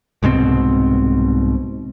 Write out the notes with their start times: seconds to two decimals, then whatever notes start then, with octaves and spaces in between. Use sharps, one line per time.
0.23 C2 G#2 B2 C4